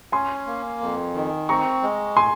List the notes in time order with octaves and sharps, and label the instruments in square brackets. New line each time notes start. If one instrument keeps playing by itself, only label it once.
[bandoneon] C#4 [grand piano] G#5 C6
[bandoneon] A#3
F2
D#3
[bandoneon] C4 [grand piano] A#5 C#6
[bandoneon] G#3
[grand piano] G#5 C6